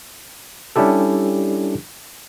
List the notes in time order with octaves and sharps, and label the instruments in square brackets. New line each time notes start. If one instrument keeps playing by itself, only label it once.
[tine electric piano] G3 C#4 D4 E4 G4 A4